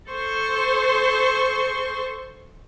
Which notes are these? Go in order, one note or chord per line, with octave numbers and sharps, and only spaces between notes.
A4 C5 C6 C#6